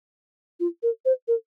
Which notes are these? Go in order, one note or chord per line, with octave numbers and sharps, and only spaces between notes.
F4
A#4
C5
A#4